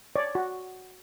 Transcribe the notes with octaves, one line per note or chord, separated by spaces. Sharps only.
C#5 D5
F#4